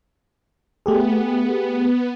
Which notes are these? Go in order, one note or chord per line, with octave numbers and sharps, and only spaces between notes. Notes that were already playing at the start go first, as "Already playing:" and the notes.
A3 B3 G4 G#4